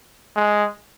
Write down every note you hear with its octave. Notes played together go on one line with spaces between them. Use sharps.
G#3